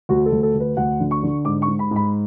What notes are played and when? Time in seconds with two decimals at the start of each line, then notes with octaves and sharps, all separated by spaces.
0.09 D2 F#4
0.26 A4
0.32 D2
0.43 A4
0.54 D2
0.60 B4
0.77 D2 F#5
1.00 D3
1.11 C#6
1.23 D3
1.45 G#2 D6
1.62 C#6
1.68 G#2
1.79 B5
1.91 G#2
1.96 B5